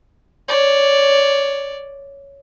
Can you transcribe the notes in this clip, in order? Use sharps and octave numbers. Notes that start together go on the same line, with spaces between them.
C#5 D5